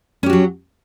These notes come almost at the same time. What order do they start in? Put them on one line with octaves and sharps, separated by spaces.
C#4 G4 F#4 F#3